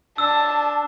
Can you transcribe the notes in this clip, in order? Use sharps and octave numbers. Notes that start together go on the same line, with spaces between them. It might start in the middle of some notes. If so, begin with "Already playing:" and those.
D4 A5 E6